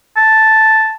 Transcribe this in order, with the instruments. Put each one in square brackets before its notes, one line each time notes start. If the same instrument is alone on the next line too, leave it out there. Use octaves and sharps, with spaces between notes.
[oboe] A5